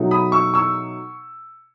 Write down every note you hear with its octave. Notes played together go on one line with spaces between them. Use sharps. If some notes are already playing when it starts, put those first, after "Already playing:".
Already playing: B2 F#3 A3 D#4
B5 D#6
C#6 E6
C#6 E6